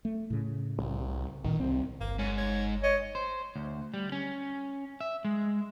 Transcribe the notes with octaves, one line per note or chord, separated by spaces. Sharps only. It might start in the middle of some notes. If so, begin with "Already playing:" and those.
A3
A2 C#3
C2
C2 A#2 D#3
C2 C4
G1 A#3
G#2 C#4
C#5
C#5 D#5
C5
D2
G3
C#4
E5
G#3